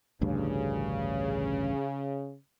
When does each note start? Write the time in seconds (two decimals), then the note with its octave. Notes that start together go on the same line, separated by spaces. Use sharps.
0.21 A1 D2 G2 C#3